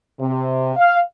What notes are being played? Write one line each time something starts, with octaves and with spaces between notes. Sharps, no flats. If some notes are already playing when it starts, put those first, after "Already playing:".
C3
F5